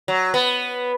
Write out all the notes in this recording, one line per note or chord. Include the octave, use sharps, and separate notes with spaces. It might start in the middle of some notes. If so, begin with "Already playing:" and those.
F#3
B3